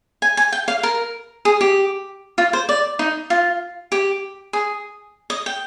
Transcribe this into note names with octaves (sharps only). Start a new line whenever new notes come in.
G#5
G#5
G5
F5
A#4
G#4
G4
F4
C5
D5
D#4
F4
G4
G#4
D#5
G5